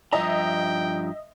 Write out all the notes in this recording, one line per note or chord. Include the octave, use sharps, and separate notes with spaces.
G2 F3 D#5 E5 G5 A#5